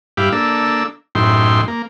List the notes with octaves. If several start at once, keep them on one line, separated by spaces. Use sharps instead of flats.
G2 E4 G4 F5 B5 D6
A#3 D4 A4 E6
F#2 A2 D#4 E4 G5 C6
A#3